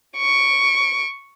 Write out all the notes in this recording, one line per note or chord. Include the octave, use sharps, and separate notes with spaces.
C#6 D7